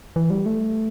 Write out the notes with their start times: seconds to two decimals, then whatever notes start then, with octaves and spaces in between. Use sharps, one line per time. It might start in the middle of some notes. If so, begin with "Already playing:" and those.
0.16 E3
0.30 G3
0.46 A3